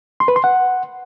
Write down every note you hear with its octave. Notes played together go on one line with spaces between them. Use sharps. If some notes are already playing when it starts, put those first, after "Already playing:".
C6
B4
C6
F#5